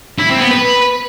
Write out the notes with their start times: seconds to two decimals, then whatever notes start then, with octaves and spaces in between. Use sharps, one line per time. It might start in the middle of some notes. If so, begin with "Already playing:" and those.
0.19 E4
0.29 C4
0.40 B3
0.51 B4